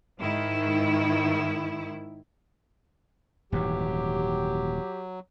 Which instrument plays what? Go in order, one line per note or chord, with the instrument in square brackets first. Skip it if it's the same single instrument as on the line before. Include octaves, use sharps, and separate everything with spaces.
[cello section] G#2 D#3 E4
[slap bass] D#1 G#2 E3 [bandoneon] F#3 [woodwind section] G4